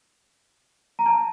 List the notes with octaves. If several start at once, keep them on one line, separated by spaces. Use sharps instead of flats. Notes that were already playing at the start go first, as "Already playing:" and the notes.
A#5
A5